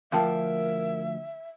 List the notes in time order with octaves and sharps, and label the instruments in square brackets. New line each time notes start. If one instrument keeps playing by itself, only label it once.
[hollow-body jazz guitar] D2 F3 [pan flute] A#4 [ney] E5 [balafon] F5 G5 A5